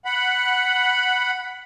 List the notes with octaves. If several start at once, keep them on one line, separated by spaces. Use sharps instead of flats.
F#5 B5